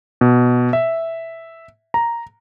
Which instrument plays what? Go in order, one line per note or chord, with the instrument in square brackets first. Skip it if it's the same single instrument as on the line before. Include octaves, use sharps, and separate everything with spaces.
[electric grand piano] B2
E5
A#5